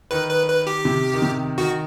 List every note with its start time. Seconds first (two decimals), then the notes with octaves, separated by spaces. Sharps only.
0.11 D#3 B4
0.30 B4
0.48 B4
0.67 G4
0.85 C3
1.14 D#3
1.22 C3
1.58 D#3 F#4